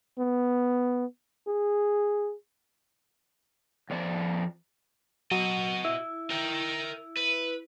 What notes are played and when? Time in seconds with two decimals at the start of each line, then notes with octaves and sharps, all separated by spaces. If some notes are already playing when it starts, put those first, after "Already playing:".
0.19 B3
1.47 G#4
3.90 F2 F3 D5
5.31 F#3 F#4 D#5
5.85 E4
6.30 A#4 G5
7.17 B4